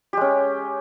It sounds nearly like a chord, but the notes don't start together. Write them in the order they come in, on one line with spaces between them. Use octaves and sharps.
G4 G#3 C#4